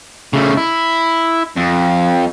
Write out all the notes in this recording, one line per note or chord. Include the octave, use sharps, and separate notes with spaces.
C#3 A3
E4
F2